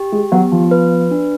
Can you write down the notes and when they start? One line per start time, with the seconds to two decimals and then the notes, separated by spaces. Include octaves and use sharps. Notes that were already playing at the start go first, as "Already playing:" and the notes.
Already playing: G4
0.12 G#3
0.32 F#3 B3
0.52 F3
0.71 B4
1.11 D4